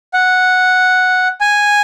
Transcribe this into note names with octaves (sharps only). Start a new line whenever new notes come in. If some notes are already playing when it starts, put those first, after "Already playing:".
F#5
G#5